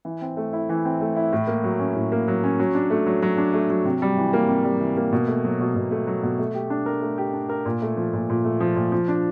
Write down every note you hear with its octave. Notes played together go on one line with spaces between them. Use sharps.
E3
C4
A3
E4
E3
C4
A3
E4
A2
A#3
F#3
C#4
A2
A#3
F#3
C#4
F#3
D4
A3
F#3
F#3
D4
A3
F#3
C3
G3
E3
A#3
C3
G3
E3
A#3
B2
A3
F#3
B2
B2
A3
F#3
B2
A3
G4
D4
A#4
A3
G4
D4
A#4
A#2
A3
F3
A#2
A#2
A3
F3
A#2
F3
D4